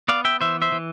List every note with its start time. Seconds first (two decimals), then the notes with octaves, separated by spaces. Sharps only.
0.08 B3 D5 F5
0.25 E5 G5
0.41 E3 C5 E5
0.62 C5 E5
0.72 E3